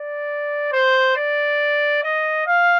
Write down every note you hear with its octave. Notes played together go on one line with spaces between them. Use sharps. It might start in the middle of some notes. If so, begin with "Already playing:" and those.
Already playing: D5
C5
D5
D#5
F5